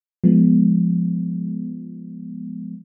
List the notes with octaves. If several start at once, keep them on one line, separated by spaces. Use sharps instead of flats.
F3 G#3 B3